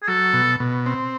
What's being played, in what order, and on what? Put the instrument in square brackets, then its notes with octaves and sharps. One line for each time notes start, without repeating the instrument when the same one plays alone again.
[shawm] G#4
[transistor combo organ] F#3 [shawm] A4
[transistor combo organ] B2
B2
C4